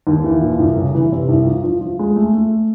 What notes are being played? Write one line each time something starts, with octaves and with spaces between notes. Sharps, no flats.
D#2
E3
A#2
C2
C#3
E3
C3
C2
F3
F3
F3
G#3
A3
A3